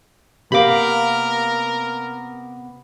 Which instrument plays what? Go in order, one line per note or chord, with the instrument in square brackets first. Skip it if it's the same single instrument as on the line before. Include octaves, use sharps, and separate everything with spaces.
[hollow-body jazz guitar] C3 A#3 B3 [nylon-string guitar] G4 F5 [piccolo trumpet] A#4 [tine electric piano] B5 D6